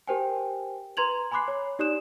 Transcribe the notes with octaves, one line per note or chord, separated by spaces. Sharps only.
G4 A#4 C5 G5 G#5
B4 A#5 C6 G#6 F7 F#7
G#5 B5 C6 D6 F#6 C7
C#5
D#4 G4 D5 D#6 F#6 E7